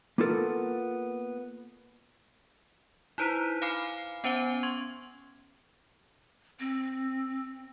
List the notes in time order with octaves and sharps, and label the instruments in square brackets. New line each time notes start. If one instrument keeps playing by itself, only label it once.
[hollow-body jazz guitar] A#3 B3 F4 G4 A4 A#4
[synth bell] D#4 E4 B4 C5 A#5 B6
F5 G#5 B5 D6 F6 C7
B3 C#4 C5 G#5 G7
C6 C#6 G#6
[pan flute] C4